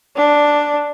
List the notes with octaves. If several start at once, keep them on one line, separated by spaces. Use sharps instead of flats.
D4